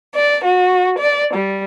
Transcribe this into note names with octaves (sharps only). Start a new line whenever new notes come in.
D5
F#4
D5
G3